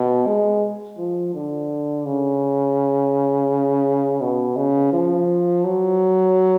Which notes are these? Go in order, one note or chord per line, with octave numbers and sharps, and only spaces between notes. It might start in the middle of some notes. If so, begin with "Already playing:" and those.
Already playing: B2
G#3
F3
D3
C#3
B2
C#3
F3
F#3